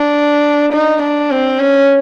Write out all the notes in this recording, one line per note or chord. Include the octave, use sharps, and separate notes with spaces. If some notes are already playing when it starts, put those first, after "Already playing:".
Already playing: D4
D#4
D4
C4
C#4